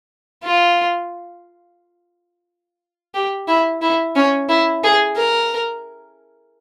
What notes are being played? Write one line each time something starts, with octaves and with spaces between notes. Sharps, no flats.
F4
G4
E4
E4
C#4
E4
G#4
A#4